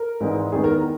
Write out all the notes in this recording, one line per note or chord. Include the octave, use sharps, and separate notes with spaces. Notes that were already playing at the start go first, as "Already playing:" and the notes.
Already playing: A#4
G#1 G#2 E3 G#3
E2 D#3 G#3 B3 G#4
A#4